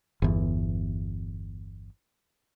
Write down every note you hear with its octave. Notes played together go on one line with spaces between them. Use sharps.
G1 E2